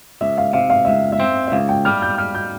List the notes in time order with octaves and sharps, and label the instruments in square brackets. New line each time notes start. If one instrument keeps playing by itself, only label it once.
[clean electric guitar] C#2 [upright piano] E5
[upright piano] F5
[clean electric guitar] C3 [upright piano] F5
[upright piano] F5
[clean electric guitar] C#2 [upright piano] E5
[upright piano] E5
[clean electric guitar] C4
[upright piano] E5
[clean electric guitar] C#2 [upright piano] F5
[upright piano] G5
[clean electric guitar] G3 [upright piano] F6
[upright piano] G6
[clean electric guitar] G3 [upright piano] F6
[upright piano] G6